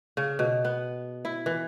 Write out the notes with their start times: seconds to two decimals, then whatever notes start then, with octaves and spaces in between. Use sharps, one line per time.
0.17 C#3
0.39 B2
0.65 B3
1.25 E4
1.46 E3